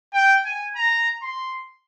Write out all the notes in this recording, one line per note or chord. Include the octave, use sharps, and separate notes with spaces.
G5
G#5
A#5
C6